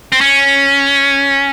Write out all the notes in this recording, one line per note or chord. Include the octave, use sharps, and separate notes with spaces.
C4
C#4